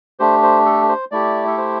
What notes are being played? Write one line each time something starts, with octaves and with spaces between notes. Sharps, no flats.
A3 D4 G4 C5
C5
A4
C5
A3 E4 G4 D5
A4
C5